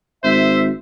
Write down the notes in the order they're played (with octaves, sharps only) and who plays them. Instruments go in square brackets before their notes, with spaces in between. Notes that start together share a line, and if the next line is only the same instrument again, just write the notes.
[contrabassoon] G#1 [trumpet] C5 [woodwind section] E5